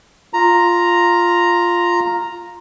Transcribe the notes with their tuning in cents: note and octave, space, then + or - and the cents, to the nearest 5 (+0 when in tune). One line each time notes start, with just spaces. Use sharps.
F4 +0 A#5 +0